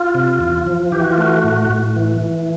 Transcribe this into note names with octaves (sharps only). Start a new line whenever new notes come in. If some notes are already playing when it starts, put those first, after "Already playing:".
Already playing: F4
C3
E2
F3
E3 G4
F#4
F4
A3 F#4
A2
A2
E3
E3